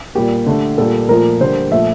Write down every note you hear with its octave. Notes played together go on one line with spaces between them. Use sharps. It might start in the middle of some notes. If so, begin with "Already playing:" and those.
A#2 G3 A#3 G4
D3 A3
A#2 G3 A#3 A4
A#2 F3 A3 A#4
D3 G3 A#3 C5
A#2 F3 A3 E5